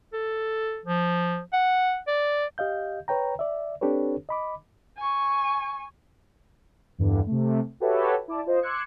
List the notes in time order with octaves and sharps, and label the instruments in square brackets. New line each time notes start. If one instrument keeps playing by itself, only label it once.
[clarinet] A4
F3
F#5
D5
[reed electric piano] G4 D#5 F5 G6
B4 C#5 G5 A#5
D5 E5
C4 D4 G4 A4 B4 C#5
D#5 B5 D6
[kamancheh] G#5 C#6
[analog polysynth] E2 G2 D3
C3 A3
F#4 G4 A4 B4 C#5 E5
E4 D5 A5
F4 C5 D#5
C6 D6 E6 F#6 G#6 C#7